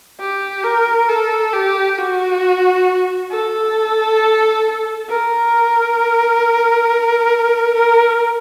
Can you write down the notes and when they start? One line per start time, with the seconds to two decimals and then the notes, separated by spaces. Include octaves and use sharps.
0.20 G4
0.64 A#4
1.09 A4
1.53 G4
1.98 F#4
3.31 A4
5.09 A#4
7.75 A#4